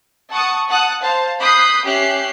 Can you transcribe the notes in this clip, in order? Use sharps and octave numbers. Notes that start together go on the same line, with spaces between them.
F#5 A5 C#6 D#6
F#5 A5 D#6 F#6
C5 F5 A5
B5 D#6 F#6 G6 B6 C7
C#4 G4 E5 F#6 C7